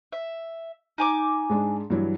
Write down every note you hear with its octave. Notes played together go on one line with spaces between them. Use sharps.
E5
D#4 G#5 D6
G#2 G#3 D4
G2 E3 F#3